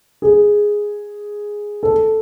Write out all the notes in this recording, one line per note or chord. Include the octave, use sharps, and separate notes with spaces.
G#4
A4